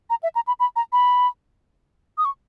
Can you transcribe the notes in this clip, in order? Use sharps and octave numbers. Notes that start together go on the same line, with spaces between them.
A#5
E5
A#5
B5
B5
A#5
B5
D#6
C#6